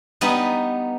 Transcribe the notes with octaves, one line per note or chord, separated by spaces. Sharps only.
G3 B3 D#4